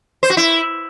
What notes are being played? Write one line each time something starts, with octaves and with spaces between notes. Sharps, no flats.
C5
F#4
E4